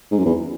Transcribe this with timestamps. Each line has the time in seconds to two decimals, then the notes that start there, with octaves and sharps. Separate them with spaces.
0.11 G#2
0.18 F#2
0.25 E2